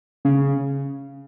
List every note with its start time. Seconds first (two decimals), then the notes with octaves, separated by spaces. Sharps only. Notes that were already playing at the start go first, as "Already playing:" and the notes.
0.25 C#3